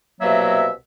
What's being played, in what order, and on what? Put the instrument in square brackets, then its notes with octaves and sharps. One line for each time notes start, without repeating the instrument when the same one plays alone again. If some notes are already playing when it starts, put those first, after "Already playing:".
[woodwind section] C2 B2 F#3 A#3 E5